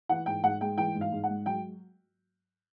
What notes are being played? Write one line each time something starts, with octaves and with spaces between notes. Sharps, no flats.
E3 F#5
G#2 G5
G#2 F#5
G#3 G5
E3 G5
G#2
F5
G#2
F#5
G#3
F#3 G5